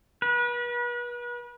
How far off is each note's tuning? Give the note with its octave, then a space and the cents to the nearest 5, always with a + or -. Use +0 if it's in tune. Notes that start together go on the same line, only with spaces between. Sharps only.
B4 -35